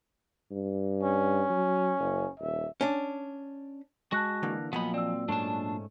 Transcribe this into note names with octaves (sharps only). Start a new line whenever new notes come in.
G2
C#4
F#3
F#1
D#1 E5
C#4 D4
G#3 F#4 A5 F#6 A#6
D3 E3 A#3
A#2 F3 F#3 B3 D#5 B5
C4 D5 E6
G#2 A3 C#4 D4 A5